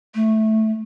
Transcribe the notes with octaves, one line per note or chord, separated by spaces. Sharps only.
A3